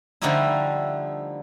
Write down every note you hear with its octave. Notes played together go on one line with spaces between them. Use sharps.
D3 F3 G3 A3 D#4 E4